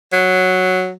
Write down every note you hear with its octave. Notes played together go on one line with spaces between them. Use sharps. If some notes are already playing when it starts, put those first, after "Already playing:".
F#3